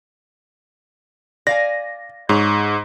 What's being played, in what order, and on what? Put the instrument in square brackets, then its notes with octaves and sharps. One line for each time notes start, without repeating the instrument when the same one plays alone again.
[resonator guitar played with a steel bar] D5 F5 G#5 [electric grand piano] A#6
[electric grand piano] G#2 [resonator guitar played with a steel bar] G#4 C#5